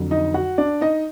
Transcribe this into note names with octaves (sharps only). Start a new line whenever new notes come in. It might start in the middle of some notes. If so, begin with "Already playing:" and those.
Already playing: F2 D3 F#3
D#4 D#5
F#4 F#5
D4 D5
D#4 D#5